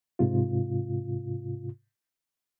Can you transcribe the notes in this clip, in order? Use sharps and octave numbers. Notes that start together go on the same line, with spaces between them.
G#2 C3 F4